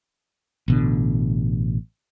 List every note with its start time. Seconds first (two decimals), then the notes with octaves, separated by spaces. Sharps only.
0.68 A1 B2 D3